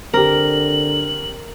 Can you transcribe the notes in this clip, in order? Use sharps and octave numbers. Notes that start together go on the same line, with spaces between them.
D3 C4 G4 A#4 F#7